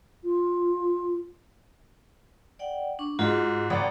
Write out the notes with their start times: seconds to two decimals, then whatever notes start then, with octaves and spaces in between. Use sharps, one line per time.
0.24 F4
2.59 D5 F#5 G5
2.99 D4 C#6
3.19 G#2 F4 F#4 G#4
3.70 G#1 G5 B5